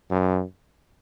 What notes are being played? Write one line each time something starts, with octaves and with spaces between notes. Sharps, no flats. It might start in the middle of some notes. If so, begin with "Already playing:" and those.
F#2